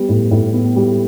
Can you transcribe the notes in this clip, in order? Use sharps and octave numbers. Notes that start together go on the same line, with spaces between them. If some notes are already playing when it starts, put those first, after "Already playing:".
Already playing: G3 B3
A2
A2
B3
G3